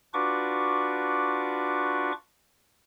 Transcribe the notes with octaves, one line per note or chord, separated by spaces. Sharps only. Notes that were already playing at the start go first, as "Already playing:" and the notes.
D4 F4 F#4 B4 C#6 D6